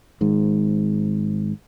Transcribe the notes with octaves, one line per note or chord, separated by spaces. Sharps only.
G#1 G#2